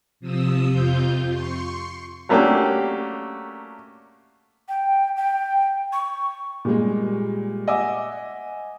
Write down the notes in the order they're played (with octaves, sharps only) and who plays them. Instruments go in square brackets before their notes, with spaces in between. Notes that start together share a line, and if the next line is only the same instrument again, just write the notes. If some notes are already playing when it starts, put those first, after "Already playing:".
[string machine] C3 F3 D#6 E6
F2 C3 F4 G6
C6 C#6
[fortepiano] F#3 A3 A#3 C#4 D4 G4
[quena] G5
G5
C#6
[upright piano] A#2 G3 G#3
D#5 E5 F#5 G#5 D6 E6